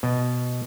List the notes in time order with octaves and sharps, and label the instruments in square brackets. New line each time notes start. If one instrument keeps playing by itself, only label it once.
[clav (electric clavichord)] B2